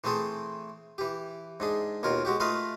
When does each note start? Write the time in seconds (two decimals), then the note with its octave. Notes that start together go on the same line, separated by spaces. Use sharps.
0.04 E3 A3 C4 G#4 A4 C5
0.98 E3 G4
1.60 G#2 D4 G#4
2.03 D#2 B2 F4 A#4
2.25 G#3 F#4 G4
2.40 A3 F4 B4 D#5 F5